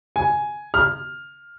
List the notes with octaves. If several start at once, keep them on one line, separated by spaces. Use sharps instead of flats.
G#5
F6